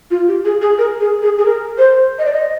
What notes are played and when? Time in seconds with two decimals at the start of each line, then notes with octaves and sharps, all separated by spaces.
0.10 F4
0.27 G4
0.45 G#4
0.61 G#4
0.78 A#4
1.00 G#4
1.22 G#4
1.38 G#4
1.45 A#4
1.78 C5
2.18 D#5
2.25 D5
2.33 D#5